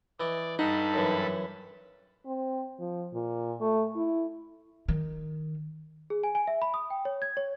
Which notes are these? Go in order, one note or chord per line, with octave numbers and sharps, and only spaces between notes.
E3 D5 D#5
G2 D#4 A4 F#5 B5
F#2 E3
C4
F3
A#2
A3
E4
D#3
G#4
G#5
G#5
E5
B5
D#6
G5
C#5
G#6
C#5